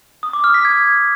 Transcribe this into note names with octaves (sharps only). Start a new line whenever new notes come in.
D#6
D6
F6
B6
G#6